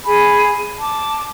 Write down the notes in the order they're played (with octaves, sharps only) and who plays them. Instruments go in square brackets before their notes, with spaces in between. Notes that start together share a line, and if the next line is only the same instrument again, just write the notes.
[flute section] G#4 G#5 B5
A5 D6